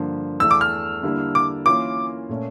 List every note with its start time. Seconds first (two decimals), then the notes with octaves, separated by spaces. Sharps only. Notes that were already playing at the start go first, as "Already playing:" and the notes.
Already playing: G2 D3 F3 A#3
0.40 E2 E3 A3 E6
0.51 D6
0.61 F6
1.03 D3 G3 A#3 E4 A4
1.35 D6
1.66 E3 A#3 C#4 F4 A#4 D6
2.29 A#2 A3 C#4